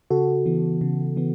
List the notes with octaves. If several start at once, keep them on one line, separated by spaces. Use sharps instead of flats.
C#3 F#4 A4
E3 B3
C#3
E3 B3